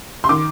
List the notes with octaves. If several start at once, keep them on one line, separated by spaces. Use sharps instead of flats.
C6
D#3 D6